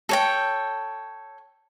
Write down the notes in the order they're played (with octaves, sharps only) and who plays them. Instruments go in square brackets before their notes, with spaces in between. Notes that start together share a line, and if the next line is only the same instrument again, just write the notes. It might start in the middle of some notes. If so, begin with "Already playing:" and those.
[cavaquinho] A4 C#5 G5